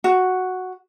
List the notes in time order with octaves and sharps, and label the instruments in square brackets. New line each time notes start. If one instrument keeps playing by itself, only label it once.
[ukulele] F#4